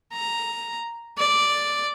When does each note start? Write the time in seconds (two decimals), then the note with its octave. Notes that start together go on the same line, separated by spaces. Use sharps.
0.12 A#5
1.18 D5